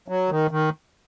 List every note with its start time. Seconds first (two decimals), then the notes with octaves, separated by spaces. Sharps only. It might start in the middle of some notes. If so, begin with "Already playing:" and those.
0.08 F#3
0.30 D#3
0.51 D#3